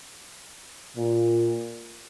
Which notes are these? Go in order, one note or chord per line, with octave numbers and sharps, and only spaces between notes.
A#2